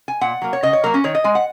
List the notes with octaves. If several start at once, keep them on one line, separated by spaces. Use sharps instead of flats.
G#5
A#2 F#5
F#3 A#3
C#5
C#3 D#5
C#5
F#3 A#3 A#4
C#4
D#3 C#5
D#5
G#3 G#5
F#5